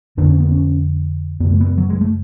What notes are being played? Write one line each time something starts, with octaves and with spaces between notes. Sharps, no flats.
F2 D3 D4
C#4
B3
C#4
F#2 C#3 B3
A3
B3
F#3
G#3
A3